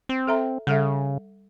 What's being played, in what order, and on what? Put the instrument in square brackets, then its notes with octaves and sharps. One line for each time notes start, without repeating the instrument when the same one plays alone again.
[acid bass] C4
[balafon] A4 E5 A#5
[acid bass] C#3 [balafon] G3 A4 E5